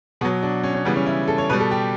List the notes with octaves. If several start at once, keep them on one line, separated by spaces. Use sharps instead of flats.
B2 F#3 B3
D4
C#4
C#4
C#3 E3 G3 B3
C#4
E4
A4
C#5
B2 G3 B4
A4
G4